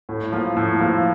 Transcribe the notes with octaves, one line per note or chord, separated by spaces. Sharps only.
A2
F3 A#3
A2
F3 A#3